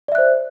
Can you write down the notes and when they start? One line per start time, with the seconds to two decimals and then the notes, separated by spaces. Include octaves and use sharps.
0.08 D5
0.12 E5
0.15 F#6
0.18 C5